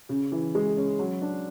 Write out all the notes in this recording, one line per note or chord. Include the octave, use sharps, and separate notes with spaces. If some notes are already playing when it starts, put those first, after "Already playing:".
C#3
E3
G#3
C#4
F#3
D4